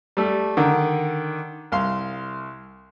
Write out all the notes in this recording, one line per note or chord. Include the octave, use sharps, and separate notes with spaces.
G3 A3
D3 D#3
C2 F5 C6